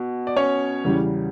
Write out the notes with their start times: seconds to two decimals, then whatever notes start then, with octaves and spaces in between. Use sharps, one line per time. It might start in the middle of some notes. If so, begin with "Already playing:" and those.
Already playing: B2
0.27 D5
0.36 C#4 C#5
0.84 E2 C#3 G3